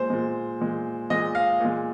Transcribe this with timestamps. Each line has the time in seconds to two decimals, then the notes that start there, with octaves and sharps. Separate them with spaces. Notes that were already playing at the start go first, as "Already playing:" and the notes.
Already playing: A#2 G#3 C5
0.10 A#2 G#3
0.60 A#2 G#3
1.10 A#2 G#3 D#5
1.35 F5
1.60 A#2 G#3